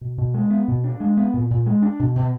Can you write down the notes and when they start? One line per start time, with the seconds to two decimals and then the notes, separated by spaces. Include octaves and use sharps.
0.01 B2
0.18 B2
0.34 G#3
0.50 B3
0.68 B2
0.84 D4
1.00 G#3
1.17 B3
1.33 A#2
1.50 A#2
1.66 G#3
1.82 D4
1.99 B2
2.16 B2